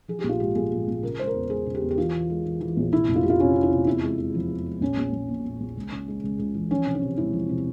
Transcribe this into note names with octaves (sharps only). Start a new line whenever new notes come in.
F3 G#4
G4
A#1
F4
G#2 G4
A#1 G#4
A#1
A#1
C#3 A#4
G#3 C5
A#4
E2
G#3 G#4
C#3
G4
E2
G4
E3 F4
E3
G#3
E3
E3
A#1
C3 E4
F1
F4
F1 G4
F4
C3 C#4
C3
E4
C3
E2 E4
G#3
G#3
F3
E2
G#3
A#1 C#4
A#1
A#1
A#2
A#2
A#1
C#2
C#3
G#3
C#2
C#2
E3
F3 C#4
C3
C#4
C3
E1 E4
F3
C3